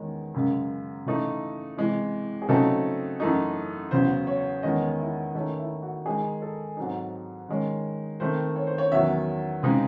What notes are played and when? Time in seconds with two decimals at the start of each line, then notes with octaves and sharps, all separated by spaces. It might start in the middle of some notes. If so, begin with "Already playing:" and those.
Already playing: E2 D#3 G#3 C#4
0.34 F#2 C#3 G#3
1.06 C#3 E3 A3 D#4
1.77 C3 E3 G#3
2.42 G#4
2.49 C#3 F#3 A3 C4 D#4 A4
3.20 F#2 E3 A3 D#4
3.91 E2 C#3 F#3 C5
4.27 C#5
4.62 E2 D#3 G#3 C#4 D#5
4.99 E4
5.35 D#3 A3 C#4 D#4
5.59 E4
5.82 F#4
6.06 D#3 G#3 D#4 G#4
6.42 A4
6.77 G#2 F#3 C4 D#4
7.49 D#3 G#3 C#4
8.20 D#3 A3 C4 C5
8.56 C#5
8.67 C5
8.78 C#5
8.92 E2 D#3 F#3 C#4 E5
9.63 C#3 G#3 C4 D#4